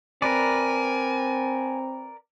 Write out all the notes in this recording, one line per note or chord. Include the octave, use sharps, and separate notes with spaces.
C4 A#4 B4 D5 G#5